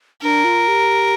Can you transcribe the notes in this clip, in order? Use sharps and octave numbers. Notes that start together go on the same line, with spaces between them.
D4 A#4
F4
G4